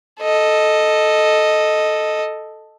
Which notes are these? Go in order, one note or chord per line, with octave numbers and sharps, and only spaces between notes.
A4 D#5